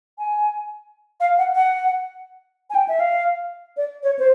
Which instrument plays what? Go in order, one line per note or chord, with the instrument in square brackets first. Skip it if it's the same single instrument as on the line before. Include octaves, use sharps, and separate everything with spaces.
[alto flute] G#5
F5
F#5
F#5
G#5
G5
E5
F5
D5
C#5
C5